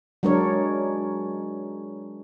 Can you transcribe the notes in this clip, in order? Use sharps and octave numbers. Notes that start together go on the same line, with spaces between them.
F#3 G#3 D4 A#4 C#5